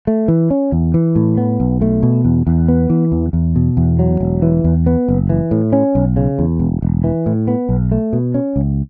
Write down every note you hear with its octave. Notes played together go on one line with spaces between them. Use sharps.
A3
E3
C#4
E2
E3
A2
B3
B1
A3
B2
E2
E2
B3
E3
E2
E2
B2
E2
F#3
E1
E3
E2
B3
F#1
E3
A2
C#4
B1
C#3
E2
E1
E1
E3
A2
B3
B1
A3
B2
C#4
C#2